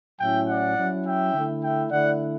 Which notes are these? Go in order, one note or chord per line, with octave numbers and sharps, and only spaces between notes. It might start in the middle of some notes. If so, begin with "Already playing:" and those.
A2 F#3 C#4 E4 E5 G5
D5 F#5
F#3 C#4 E4
E5 G5
D3 A3 E4
E5 G5
D3 A3 E4 D5 F#5